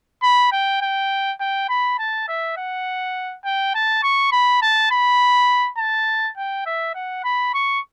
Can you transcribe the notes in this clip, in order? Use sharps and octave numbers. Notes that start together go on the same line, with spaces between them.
B5
G5
G5
G5
B5
A5
E5
F#5
G5
A5
C#6
B5
A5
B5
A5
G5
E5
F#5
B5
C#6